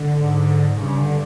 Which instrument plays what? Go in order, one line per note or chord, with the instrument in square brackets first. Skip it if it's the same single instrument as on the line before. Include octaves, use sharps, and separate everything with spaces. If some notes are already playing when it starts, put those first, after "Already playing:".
Already playing: [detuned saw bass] D3
[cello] G#2
[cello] G2 [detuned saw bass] C#3
[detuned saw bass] D3